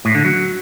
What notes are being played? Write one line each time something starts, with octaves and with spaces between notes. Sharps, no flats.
A2
D3
F#3